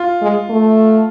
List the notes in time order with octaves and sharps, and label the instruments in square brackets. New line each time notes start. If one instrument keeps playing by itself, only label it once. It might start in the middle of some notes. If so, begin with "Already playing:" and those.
Already playing: [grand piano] F4
[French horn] G#3
A3